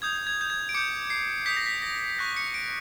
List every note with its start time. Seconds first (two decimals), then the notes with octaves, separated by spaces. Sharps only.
0.02 D#6 G6 G#6
0.27 G#6
0.41 G6
0.50 G#6
0.69 D7
0.74 D6 G6 C#7
1.10 C7
1.46 D#6 G6 B6
1.57 A#6
1.66 B6
1.82 A#6
2.18 C#6 F#6 A#6
2.37 C#7
2.54 D7